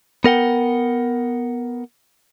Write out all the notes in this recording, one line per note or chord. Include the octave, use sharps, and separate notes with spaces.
B3 A#4 F#5 G5